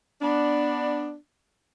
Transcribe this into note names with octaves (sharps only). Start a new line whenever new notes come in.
B3 D4